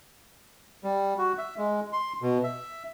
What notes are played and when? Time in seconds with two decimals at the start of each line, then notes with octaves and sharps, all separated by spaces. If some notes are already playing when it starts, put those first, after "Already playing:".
0.84 G3
1.18 F#4
1.38 E5
1.58 G#3
1.93 C6
2.22 B2
2.44 E5